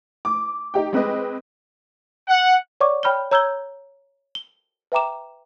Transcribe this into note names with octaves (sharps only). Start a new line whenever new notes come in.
D6
D#4 G4 G5
G#3 C4 B4 D#5
F#5
C#5 D5 F#5 C#6 D6
C#5 G5 B5 F6 G6 G7
C#5 A#5 E6 G6 G#6 G7
G7
B4 E5 G5 A#5 D6 E7